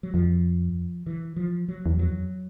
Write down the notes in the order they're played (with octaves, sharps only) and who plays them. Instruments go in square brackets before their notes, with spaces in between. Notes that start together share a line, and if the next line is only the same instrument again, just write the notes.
[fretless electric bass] F#3
[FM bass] F2 [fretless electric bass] F3
[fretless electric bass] E3
F3
F#3
[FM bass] E2
[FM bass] F2 [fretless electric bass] F#3